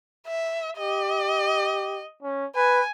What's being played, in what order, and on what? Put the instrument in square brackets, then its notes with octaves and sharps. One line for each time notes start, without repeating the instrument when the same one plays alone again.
[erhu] E5
[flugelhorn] G4 [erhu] D#5
[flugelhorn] C#4
[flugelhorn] B4 [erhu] G#5